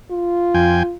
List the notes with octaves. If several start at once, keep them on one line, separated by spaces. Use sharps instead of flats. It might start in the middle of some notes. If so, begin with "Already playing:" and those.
F4
F2 G5 G#5